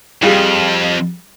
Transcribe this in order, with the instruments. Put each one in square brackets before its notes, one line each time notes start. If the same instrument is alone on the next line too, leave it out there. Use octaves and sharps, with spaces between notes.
[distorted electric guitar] F2 [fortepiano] G3 F4 G#4